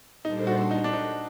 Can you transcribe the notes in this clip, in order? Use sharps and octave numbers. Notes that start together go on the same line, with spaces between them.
A#2 G3 D4 D#4 A4 C5
F#4
D#4
D4
D#4